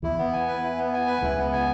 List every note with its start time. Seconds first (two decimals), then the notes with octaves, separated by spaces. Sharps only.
0.03 E2 E3 E4
0.18 B3
0.33 G#5
0.47 B4
0.63 E4
0.78 B3
0.93 G#5
1.07 B4
1.22 C#2 C#3 E4
1.38 B3
1.53 G#5